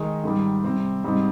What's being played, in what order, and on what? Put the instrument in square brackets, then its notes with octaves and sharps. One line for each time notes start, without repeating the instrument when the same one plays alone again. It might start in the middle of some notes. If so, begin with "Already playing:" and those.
Already playing: [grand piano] D#3 G#3 D#4
G#2 D#3 G3
C3 G3 C4
G#2 G3 C4 D#4